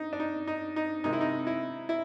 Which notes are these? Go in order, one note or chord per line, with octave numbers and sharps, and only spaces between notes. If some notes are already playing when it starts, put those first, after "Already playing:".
Already playing: D#4
D4
D#4
D#4
D#4
C3 D#3 G#3 D#4
E4
D#4
E4
E4